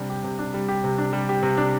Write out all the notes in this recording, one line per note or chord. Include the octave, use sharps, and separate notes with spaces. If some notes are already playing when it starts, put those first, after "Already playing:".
Already playing: C3 G3 D4
G4
C3
D4
G3
G4
C3
D4
G3
G4
C3
D4